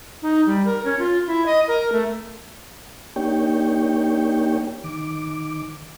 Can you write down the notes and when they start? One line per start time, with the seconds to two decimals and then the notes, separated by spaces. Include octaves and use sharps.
0.22 D#4
0.46 G3
0.66 A#4
0.84 C#4
0.99 F4
1.27 E4
1.46 D#5
1.68 A#4
1.92 A3
3.16 A#3 D4 D#4 G4 C#5 G5
4.84 D#3 D6